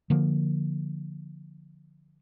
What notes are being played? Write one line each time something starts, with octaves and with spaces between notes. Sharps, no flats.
D3 F3 A#3